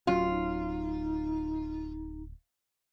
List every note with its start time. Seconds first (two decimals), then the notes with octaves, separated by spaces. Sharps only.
0.07 D1 F#3 C#4 F4 F#4
0.31 D#4